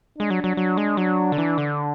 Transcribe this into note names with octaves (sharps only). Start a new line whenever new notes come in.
G#3 D4
F#3
F#3
F#3
G#3
F#3 D4
D3
E3
D3